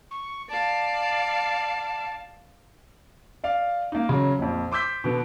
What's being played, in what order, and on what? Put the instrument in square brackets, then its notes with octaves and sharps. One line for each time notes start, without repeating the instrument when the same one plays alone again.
[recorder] C#6
[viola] D5 F5 [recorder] A5
[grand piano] D5 F5
A#3 D#4
C#3 F#3
A#1 F2
C6 D6 E6 G6 B6
B2 D3 B3